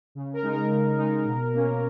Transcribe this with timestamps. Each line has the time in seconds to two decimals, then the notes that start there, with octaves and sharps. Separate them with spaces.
0.15 C#3
0.33 A#4
0.42 G#3 D#4
0.52 A#4
0.70 C#3
0.98 G#3 D#4
1.25 B2
1.53 A#3 C#4